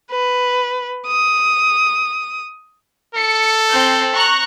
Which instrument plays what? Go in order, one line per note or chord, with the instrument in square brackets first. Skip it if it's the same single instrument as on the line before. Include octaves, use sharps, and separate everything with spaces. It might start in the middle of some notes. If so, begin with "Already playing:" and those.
[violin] B4
D#6
[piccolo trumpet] A4 [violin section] C#7
[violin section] C4 G6
A#5 C#6 F#6